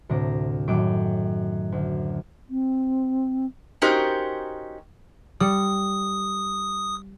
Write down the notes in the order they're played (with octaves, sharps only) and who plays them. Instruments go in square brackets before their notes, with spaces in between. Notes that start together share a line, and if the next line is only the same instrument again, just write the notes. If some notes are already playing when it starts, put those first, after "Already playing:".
[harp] D2 A2 C3 A#5 D6 A#6
F#2 A2 D#3 G5 D6 E6
D2
[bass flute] C4
[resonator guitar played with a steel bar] C#4 D#4 F#4 G4 A#4 C5
[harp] G3 C#7 [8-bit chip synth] D#6